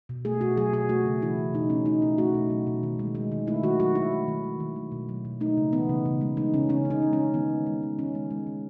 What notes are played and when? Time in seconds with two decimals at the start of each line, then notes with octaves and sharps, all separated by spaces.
0.09 B2
0.25 A3 G#4
0.41 B2 F#4
0.57 F#3 G#4
0.73 B2 G#4
0.89 A3 F#4
1.05 C#3
1.22 E3 E4
1.38 C#3
1.54 B2 D#4
1.70 A3 C#4
1.86 A3 D#4
2.02 B2 E4
2.18 A3 F#4
2.35 B2
2.50 F#3
2.67 B2
2.83 D#3
2.99 G#3
3.15 G#3
3.32 D#3
3.47 A3 E4
3.63 D#3 F#4
3.80 F#3 F#4
3.95 D#3 E4
4.12 A3
4.28 D#3
4.44 F#3
4.60 D#3
4.76 A3
4.92 B2
5.09 F#3
5.25 B2
5.40 A3 D#4
5.57 C#3
5.72 E3 B3
5.89 C#3
6.05 C#3
6.21 G#3
6.37 G#3 D#4
6.54 C#3 C#4
6.69 C#3 C#4
6.85 G#3
6.90 D#4
7.02 G#3
7.13 C#4
7.18 C#3
7.34 D#3 B3
7.50 G#3
7.66 G#3
7.83 D#3
7.98 D#3 C#4
8.15 G#3
8.31 G#3
8.47 D#3